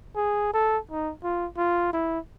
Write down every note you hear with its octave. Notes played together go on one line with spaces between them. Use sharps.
G#4
A4
D#4
F4
F4
E4